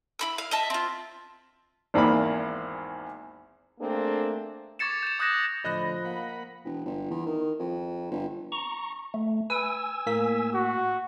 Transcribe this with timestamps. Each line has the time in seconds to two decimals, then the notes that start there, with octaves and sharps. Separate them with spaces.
0.19 E4 B5 E6
0.38 F5
0.51 D#5 E5 A5
0.70 C4 F4
1.94 G#1 E2 A#3 D5 B5
3.79 A3 A#3 C4 D4 G#4
4.79 C#6 D6 G#6 A6 C#7 E7
5.03 G6 E7
5.19 D6 D#6 F#6 G6 A#6 E7
5.64 A2 D3 F3 D#5 B5 F#6 A#6
6.05 A#3 F5 F#5 B5
6.64 E1
6.86 G1
7.10 E2
7.26 D#3
7.59 F2
8.11 G1
8.52 A#5 C#6
9.14 A3
9.50 B4 G#5 E6
10.06 A2 A#3 B6
10.54 F#4